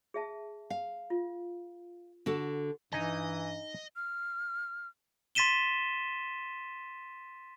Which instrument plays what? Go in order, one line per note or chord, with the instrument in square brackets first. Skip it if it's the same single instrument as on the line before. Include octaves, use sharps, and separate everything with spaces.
[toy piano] G#4 E5 A5
[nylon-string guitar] F5
[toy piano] F4
[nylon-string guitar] D3 F#4 A4
[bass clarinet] G2 [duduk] E3 [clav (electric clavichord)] D#4 G#5 [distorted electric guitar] D#5
[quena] F6
[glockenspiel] C6 A6 B6 D#7 E7 G7